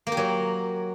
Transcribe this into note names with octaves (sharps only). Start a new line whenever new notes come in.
A#3
G4
F#3